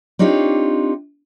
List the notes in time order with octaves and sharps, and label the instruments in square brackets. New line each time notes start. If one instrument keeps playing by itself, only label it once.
[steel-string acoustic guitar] C4 D4 D#4 F4 G4 C#5